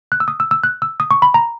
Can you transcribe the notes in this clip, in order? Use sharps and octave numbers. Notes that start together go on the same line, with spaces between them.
F#6
E6
D#6
E6
E6
F#6
E6
D#6
C#6
B5
A#5